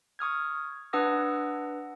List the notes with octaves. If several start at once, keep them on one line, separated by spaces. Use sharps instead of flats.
C#6 D#6 F6 G#6
D4 B4 F#5 D#6 E6 A#6